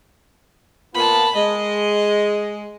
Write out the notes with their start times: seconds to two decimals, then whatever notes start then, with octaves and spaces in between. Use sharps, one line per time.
0.95 A#2 B3 F4 A5 B5
1.36 G#3 D#5